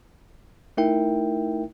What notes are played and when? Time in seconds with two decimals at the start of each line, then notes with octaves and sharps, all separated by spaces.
0.77 A3 D#4 E4 A#4 E5 G5